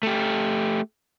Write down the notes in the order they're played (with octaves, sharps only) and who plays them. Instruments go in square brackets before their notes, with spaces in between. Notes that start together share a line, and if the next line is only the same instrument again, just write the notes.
[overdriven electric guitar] A3 G4